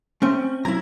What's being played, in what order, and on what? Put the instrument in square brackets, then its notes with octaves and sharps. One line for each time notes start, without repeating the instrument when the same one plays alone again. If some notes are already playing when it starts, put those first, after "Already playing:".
[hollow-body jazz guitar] A3 C4 [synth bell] C#4
[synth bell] F#3 G#6 [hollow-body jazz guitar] E4 A#5